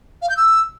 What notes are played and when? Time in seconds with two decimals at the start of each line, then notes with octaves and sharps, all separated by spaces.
0.22 F5
0.30 G6
0.37 E6